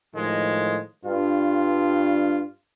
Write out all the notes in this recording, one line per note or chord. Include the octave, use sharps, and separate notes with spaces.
A2 D#3 F3 G#3
G2 F4